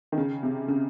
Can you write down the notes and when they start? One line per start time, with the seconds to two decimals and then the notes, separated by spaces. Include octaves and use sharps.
0.12 D#3
0.18 C#3
0.43 C3
0.68 C#3